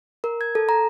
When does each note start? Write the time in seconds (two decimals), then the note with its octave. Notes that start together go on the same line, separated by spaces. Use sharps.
0.24 A#4
0.41 G#6
0.55 A4
0.69 A#5